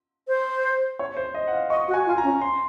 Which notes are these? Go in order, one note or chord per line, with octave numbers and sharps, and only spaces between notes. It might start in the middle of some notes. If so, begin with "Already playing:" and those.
C5
C#5
C5
D#5
F#5
F5
D#5 C#6
F#4
G#5
F4
G#5
A#5
C#4
C6